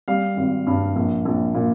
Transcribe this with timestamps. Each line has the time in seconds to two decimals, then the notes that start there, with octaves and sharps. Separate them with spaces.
0.08 G3 F5
0.37 G#1
0.67 G2
0.96 A#1
1.25 A#1
1.54 A#2